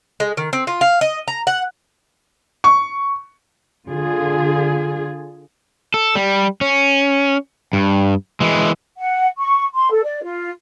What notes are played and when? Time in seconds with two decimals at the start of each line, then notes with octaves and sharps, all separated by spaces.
0.20 G#3
0.37 D#3
0.53 C4
0.67 F4
0.81 F5
1.01 D#5
1.28 A#5
1.47 F#5
2.64 C#6
3.88 D3 F4 G#4
5.94 A4
6.15 G3
6.61 C#4
7.73 G2
8.40 E3 G#3
8.98 F#5
9.37 C#6
9.74 C6
9.92 A4
10.04 D5
10.23 F4